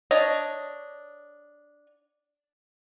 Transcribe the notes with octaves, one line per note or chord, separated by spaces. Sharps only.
D4 C#5 D#5